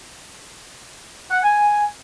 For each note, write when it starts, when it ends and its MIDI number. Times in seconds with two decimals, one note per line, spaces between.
1.30 1.43 78
1.43 1.84 80